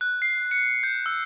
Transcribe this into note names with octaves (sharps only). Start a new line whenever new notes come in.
F#6
C7
C#7
G6
E6